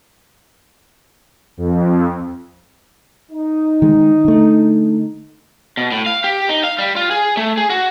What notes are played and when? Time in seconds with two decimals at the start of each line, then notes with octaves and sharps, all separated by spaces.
1.57 F2
3.32 D#4
3.82 D#3 G#3
4.25 D3 A3
5.77 B2
5.92 A2
6.06 F5
6.24 G4
6.49 D#4
6.64 F5
6.79 G3
6.96 F4
7.11 G#4
7.37 A3
7.57 G#4
7.70 F#4